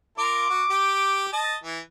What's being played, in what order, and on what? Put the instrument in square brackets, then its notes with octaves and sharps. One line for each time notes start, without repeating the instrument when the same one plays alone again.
[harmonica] F4 A#4 F5 [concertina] D6
[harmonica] F#4
G4
D#5 A5
E3